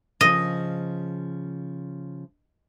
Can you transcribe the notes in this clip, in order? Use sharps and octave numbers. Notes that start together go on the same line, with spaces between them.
C#3 F3 D#5